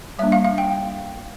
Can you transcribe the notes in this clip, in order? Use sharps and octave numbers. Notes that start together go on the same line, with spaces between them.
G3 A#3 D4 E5
F5
F5
G5